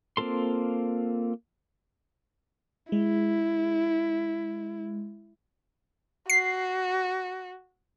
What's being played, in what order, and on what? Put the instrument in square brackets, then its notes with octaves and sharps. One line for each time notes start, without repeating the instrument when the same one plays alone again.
[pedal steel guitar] A#3 C4 F4 A4 C6
[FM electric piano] G#3 [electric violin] E4
[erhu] F#4 [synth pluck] C7